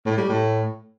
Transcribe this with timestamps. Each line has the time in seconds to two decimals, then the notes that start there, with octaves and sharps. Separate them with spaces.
0.06 A2
0.17 G3
0.29 A2